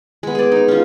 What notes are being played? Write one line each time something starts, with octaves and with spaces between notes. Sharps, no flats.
G#3 B3
G#4 D5
D#4
C#4 F4